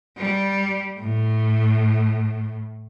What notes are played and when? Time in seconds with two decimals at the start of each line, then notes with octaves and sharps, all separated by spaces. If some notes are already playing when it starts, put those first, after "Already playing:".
0.18 G3
1.00 A2